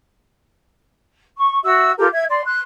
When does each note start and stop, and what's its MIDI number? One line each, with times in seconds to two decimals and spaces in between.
1.37 1.59 85
1.63 1.91 66
1.63 1.91 76
1.63 1.91 88
1.98 2.07 65
1.98 2.07 67
1.98 2.07 69
1.98 2.07 70
2.12 2.24 76
2.12 2.24 92
2.29 2.44 74
2.29 2.44 84
2.45 2.60 84
2.45 2.60 90